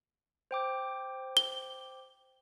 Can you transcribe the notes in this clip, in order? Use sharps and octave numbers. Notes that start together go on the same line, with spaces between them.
C5 G5 D6
G7